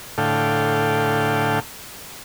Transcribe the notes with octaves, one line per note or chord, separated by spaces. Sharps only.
A2 D3 A4 F5 G5